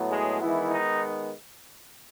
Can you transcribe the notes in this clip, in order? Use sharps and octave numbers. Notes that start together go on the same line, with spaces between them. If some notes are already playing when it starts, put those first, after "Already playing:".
Already playing: A2 F#3 B3
G#3 G#4
D#3 E3 G#3 B3 E4
D#4